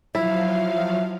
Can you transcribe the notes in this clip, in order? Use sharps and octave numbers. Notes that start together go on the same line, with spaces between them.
F3 F#3 E4 E5 F5